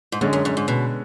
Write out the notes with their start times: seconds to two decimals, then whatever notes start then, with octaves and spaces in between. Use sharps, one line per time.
0.12 G#2
0.21 F#2 D3 G#3 C#4
0.33 F#2
0.45 F#2
0.57 G#2
0.68 B2